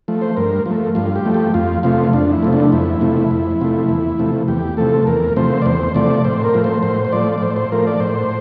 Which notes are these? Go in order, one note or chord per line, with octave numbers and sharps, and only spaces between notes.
F3 A3
C5
G2 A#4
F3
A3
G2 F4
G4
F3 A3
G4
F2 F4
C3 F3 A3 F4
F2 D4
E4
C3 F3 A3
D4
F2 E4
C3 F3 A3
F2
C3 F3 A3
E2
C3 F3 A3
E2 G4
C3 F3 A3 A4
E2 A#4
C3 F3 A3 C5
D5
E2 C5
C3 F3 A3 D5
A2 C5
A#4
F3 A3
C5
A2 C5
C5
F3 A3 D5
D5
A2 C5
C5
F3 A3 A#4
D5
A2 C5